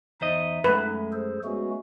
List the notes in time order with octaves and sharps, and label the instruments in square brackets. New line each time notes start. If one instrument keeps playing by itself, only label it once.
[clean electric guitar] E2 C5 D#5 [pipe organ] D#4 E5
[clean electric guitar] F#2 G#3 [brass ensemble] A3 [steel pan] B4
[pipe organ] G#4 A4 C5
[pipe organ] G#3 A3 F#4 [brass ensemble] B3 C#4 G#4